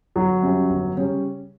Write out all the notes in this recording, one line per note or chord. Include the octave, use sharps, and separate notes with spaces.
G1 F#3
F#2 C#3 G3 C#4
G1
C#3 G3 C#4